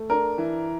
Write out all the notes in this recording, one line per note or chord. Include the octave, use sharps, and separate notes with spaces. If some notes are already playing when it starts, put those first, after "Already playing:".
Already playing: A3
D4 A#4
E3